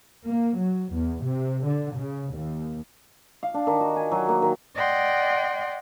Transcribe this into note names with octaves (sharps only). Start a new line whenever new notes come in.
A#3
F#3
E2
C3
D3
C#3
D#2
F5
D4
D#3
F#4
G#5
F#3
A#3
D#3
D5 D#5 F#5 G5 C6